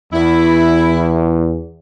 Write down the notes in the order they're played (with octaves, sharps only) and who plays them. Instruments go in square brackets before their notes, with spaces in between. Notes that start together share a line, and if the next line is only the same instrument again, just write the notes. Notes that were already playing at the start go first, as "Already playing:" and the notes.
[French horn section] E2 [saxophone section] E4